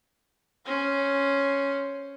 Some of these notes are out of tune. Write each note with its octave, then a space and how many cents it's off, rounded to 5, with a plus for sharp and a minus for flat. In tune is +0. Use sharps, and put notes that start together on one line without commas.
C#4 +0 C5 +0